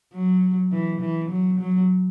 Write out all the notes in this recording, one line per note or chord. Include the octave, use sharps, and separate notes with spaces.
F#3
E3
E3
F#3
F#3